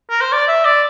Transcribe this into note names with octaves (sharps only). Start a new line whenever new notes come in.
A#4
C5
D5
E5
D5